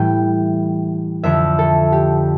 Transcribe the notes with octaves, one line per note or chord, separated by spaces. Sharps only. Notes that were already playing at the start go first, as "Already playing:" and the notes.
Already playing: A2 E3 G3 G5
F2 D3 F3 E5
A4
G4